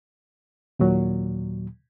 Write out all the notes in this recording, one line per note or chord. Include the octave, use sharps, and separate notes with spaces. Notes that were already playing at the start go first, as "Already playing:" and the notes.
D#2 A#2 F#3